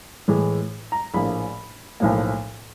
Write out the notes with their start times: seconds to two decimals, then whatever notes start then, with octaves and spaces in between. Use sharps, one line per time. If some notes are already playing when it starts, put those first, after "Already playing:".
0.28 A2 E3 G#3
0.92 A#5
1.14 A#1 A2 F3 A#3 B5
2.00 B1 A2 F3 A#3